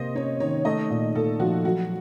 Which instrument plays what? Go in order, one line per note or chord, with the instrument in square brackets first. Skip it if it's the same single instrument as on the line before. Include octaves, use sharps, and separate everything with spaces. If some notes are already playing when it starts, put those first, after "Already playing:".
Already playing: [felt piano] C3 A#3 [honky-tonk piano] C5 D#5
[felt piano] C#4 [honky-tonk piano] C#5
[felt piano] D#3 [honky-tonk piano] C#5
[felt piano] A3 [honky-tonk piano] D#5
[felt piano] A#2
[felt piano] A#2 [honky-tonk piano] A4
[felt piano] F3 [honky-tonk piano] F#4
[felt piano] F#3 [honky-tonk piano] F#4